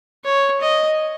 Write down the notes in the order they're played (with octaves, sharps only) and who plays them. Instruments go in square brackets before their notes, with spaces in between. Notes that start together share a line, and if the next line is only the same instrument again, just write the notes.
[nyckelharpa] C#5
D#5